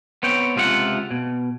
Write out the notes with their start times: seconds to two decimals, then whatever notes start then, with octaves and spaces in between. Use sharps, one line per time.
0.23 B3 C4 C#5 G5
0.56 C#2 C3 F4 G#4 F#5
1.11 B2